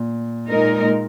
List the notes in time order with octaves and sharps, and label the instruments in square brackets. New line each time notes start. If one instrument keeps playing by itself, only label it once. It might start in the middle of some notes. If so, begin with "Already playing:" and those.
Already playing: [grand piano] A#2
[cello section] A#2 G#3 D#4 A#4